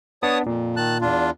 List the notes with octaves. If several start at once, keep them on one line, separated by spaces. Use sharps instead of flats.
B3 D4 C#5 A5 D#6
F2 A#2
D#3 A5 F#6
E2 D4 F4